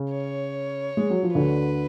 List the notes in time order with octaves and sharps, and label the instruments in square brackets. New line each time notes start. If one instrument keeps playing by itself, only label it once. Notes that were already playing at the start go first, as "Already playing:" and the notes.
Already playing: [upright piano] C#3 C#4
[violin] C#5
[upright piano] G#3
F#3
F3
[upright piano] D2 D3 [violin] B4